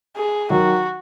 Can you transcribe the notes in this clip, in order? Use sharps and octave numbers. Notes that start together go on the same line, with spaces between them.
G#4
D#3 F#3 F#4